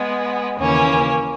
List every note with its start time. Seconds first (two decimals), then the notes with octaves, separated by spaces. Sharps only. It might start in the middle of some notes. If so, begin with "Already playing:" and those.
Already playing: G#3 B3
0.58 D#2 C#3 E3 A#3 C#4